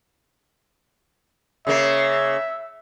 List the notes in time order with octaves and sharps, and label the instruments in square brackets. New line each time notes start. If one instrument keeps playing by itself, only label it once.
[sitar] C#3 A#3 [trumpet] E5